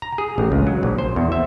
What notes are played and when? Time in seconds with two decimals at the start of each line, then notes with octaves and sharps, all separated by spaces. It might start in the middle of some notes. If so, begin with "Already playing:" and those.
0.02 A#5
0.18 G#4
0.38 A1
0.52 C#2
0.67 F#3
0.83 A#1
0.98 C5
1.16 E2
1.32 E5